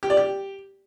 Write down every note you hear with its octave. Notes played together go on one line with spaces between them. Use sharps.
G4
D5
G4